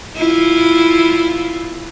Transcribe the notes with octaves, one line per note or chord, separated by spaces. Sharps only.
E4 F4